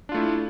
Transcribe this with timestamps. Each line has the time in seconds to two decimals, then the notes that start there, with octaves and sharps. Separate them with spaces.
0.09 D4
0.12 F4
0.14 A3
0.17 E4